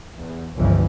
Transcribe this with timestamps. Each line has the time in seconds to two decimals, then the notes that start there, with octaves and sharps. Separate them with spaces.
0.16 E2
0.57 G1 C#2 C#3 E3 F3